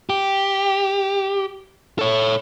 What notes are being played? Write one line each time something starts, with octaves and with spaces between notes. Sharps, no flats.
G4
A4 C#5